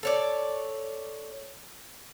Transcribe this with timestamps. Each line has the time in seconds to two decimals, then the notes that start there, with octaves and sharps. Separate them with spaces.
0.03 A4 C#5 D5